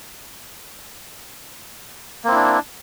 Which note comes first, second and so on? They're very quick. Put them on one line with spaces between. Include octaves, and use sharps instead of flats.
A#3 C4 E4 D4